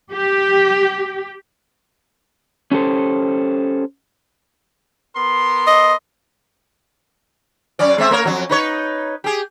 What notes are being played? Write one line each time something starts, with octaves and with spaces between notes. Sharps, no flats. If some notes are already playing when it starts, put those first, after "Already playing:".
G4
C#4 G4 A4 C5
B3 A#4 C6
D#5
F#2 C#4 D5
G#3 C4 E5
A3 A#4 C#5
F2 F3 F#3
D#4 B4 C#5
G4 G#4